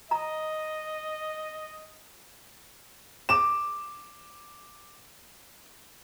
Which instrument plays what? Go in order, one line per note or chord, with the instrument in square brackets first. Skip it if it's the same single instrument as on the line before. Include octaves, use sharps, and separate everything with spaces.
[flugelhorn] D#5 [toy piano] A#5
[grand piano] D6 E7